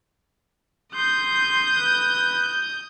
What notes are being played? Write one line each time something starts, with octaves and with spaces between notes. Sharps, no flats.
C6 D#6 G6
B4